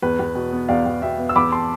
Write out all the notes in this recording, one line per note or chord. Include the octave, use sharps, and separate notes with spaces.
E2 B4
E2
B2
B3
E2 D5 F5
E2
B2 E5 G5
B3
E6
E2 B5 D6
A5 C6